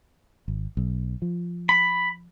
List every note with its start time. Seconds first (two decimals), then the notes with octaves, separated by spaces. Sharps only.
0.48 G#1
0.77 B1
1.22 F3
1.69 B5